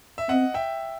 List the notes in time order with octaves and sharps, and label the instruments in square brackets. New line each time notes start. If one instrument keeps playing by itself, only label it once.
[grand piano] E5
[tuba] C4 [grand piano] D#5 F#5
[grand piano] E5 G5